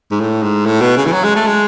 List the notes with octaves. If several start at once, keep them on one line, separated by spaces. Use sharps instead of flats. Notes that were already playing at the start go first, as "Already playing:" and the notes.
G#2
A2
G#2
A2
B2
C#3
E3
F#3
G#3
A3
G#3